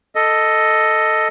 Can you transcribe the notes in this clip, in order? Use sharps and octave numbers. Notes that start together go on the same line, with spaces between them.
A4 D#5